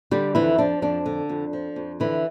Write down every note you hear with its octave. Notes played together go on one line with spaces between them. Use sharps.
D3 G3 G4
F2 E3 E4
F3 D4
F2 D4
D3
F2
F3
F2
D3 E3 E4